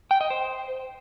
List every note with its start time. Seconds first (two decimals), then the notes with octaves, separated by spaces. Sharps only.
0.11 G5
0.21 D#5
0.30 C5